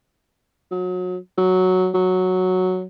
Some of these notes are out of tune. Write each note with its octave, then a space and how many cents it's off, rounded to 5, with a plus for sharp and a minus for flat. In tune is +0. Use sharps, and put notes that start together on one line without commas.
F#3 -30
F#3 +0
F#3 -5